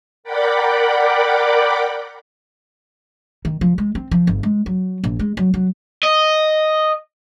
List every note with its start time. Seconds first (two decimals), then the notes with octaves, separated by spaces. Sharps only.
0.24 A#4 D5 F#5 G5 B5 D6
3.45 D#3
3.61 F3
3.78 G#3
3.95 C4
4.11 F3
4.27 G1
4.43 G#3
4.66 F#3
5.04 A#1
5.19 G#3
5.37 F#3
5.54 F#3
6.03 D#5